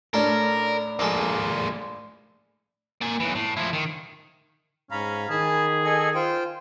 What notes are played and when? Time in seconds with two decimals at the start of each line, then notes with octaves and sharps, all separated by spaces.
0.14 A2 C#4 D4 A4 A#4
0.99 A#1 G#3 A#3 D#4 A4
3.02 A#3 G#5
3.20 B1 E3
3.35 A2
3.57 F3 E4
3.73 D#3
4.91 G#2 C#4 F5 A#5 B5
5.30 D#3 G#4 G#5 A5 B5
5.85 A4 D#5 G#5
6.15 F4 C5 G5